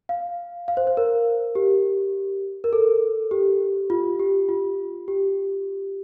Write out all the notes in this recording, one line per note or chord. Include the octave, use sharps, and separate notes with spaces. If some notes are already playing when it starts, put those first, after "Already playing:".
F5
F5
C5
C5
A#4
G4
A#4
A4
G4
F4
G4
F4
G4